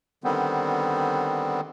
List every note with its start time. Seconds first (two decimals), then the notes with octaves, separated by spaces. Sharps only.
0.24 D3 D#3 G3 B3 C4